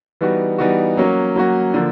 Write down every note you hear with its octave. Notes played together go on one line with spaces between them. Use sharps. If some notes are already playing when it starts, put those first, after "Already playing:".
E3 G3 B3 D#4 F#4
E3 G3 B3 D#4 F#4
F#3 A#3 C#4 F#4
F#3 A#3 C#4 F#4
D3 F3 A#3